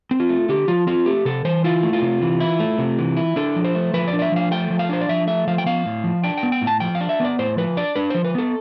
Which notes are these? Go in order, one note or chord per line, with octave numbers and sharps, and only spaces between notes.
C4
F4
A3
D3 G4
F3 F4
C4 F4
A3 G4
C3 A4
E3 C5
E4 F4
A3
F4
C3
E3
E4
A3
C3
E3
E4
D4 A4
F3
C5
A3
F3 B4
D5
D4
D5
E5
F3 F5
A3 G5
F3
F5
D4 C5
D5
F3 E5
A3 E5
F3 F5
G5
B3 F5
A2
F3
D4 G5
G5
B3
G5
A2
A5
F3 G5
F5
D4
E5
B3 D5
A2 C5
F3 B4
D4 D5
D4 B4
F3 C5
B4
B3 A4